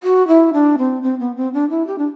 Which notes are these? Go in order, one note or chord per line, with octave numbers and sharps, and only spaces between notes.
F#4
E4
D4
C4
C4
B3
C4
D4
E4
G4
D4